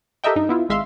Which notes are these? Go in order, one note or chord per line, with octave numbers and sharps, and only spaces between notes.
G4 A4 A#4 D#5 E5 G5
G2 D#4
B3 E4 F4
G#1 G#3 E5 F5 C6